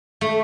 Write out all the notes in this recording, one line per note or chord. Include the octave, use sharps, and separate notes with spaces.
A3